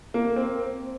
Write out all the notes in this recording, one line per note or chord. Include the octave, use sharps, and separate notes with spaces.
A#3
C4